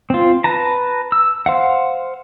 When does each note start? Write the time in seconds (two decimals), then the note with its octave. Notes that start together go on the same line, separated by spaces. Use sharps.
0.10 C4 F4
0.44 B4 A5 A#5
1.12 E6
1.46 C5 F5 F#5